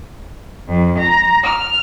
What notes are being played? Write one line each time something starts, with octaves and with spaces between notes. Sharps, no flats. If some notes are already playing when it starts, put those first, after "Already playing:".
F2
A#5
F6